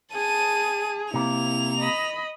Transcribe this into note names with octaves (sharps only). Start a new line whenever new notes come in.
G#4 A5 D#7
C3 A#3 E4 F7
D#5 B5